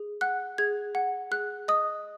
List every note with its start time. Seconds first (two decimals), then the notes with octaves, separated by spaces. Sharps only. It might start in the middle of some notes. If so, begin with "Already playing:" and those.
Already playing: G#4
0.21 F#5 F#6
0.58 G#4 G#6
0.95 F#5
1.31 G#4 F#6
1.68 D#5 D#6